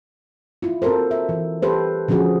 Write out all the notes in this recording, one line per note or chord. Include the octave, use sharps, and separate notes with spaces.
E4 F4
C4 F#4 A4 A#4 C5
E5
E3
G4 A4 B4 C5
D3 F3 C#4 F#4 G#4